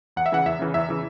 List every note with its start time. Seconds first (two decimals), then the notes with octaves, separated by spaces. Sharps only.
0.16 E2 F#5
0.26 E5
0.32 C#3 E3 F#5
0.46 E2 E5
0.59 C#3 E3
0.74 E2 E5
0.88 C#3 E3